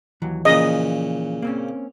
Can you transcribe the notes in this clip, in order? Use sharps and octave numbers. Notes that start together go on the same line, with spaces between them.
D#2 E3 F#3
A#2 C#3 E3 F3 D#5
A#3 C4 C#4